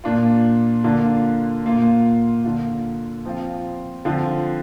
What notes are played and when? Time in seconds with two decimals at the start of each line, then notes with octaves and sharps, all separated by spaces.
0.04 A#2 A#3 D4 F4
0.84 D3 A#3 D4 F4
1.65 A#2 A#3 F4
2.44 D3 A#3 F4
3.26 F3 C4 F4
4.05 D3 F3 C4 F4